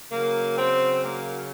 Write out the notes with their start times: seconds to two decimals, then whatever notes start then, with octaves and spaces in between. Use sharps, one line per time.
0.10 C#3 F#3 A#3
0.57 C4
1.04 A#3